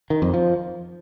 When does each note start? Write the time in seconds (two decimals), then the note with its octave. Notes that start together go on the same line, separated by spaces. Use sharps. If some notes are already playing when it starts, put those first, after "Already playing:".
0.10 D#3
0.22 F2
0.34 F3